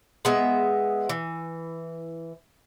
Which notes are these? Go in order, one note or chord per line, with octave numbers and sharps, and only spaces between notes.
G#3 B3 E5
E3